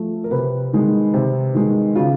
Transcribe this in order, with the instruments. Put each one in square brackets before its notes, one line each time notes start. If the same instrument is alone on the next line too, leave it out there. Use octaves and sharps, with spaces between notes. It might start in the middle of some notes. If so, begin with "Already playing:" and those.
Already playing: [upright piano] F3 A3
A#4
C3 B4
D#3 G#3
C3
D#3 G#3
C#3 F4